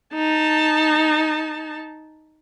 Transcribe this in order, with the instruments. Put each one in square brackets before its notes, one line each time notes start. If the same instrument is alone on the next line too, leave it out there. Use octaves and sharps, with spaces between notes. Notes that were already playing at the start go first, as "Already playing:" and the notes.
[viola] D#4 A5